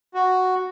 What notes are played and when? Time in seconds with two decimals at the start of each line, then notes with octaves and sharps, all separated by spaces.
0.14 F#4